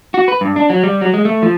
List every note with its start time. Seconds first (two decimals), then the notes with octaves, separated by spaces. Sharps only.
0.14 F#4
0.28 B4
0.41 G2
0.56 D4
0.70 F#3
0.83 G3
1.01 F#3
1.14 G#3
1.25 A3
1.42 F3